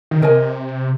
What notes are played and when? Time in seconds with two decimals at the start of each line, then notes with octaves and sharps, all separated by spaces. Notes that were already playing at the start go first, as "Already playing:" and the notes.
0.11 D#3
0.21 C3 A#4 D#5 G#5